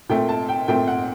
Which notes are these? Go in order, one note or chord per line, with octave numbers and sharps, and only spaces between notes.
A#2 A3 C4 G5
A5
G5
A#2 A3 C4 G5
F#5